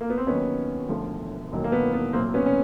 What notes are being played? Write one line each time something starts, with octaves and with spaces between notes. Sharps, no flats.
A#3
B3
C4
D#2 D#3 F#3 B3 C#4
E1 D2 D3 F3
E1 D#2 D#3 F#3
A#3
B3
B3
C2 A#2 F#3 A#3 C4
B3 C#4
C#4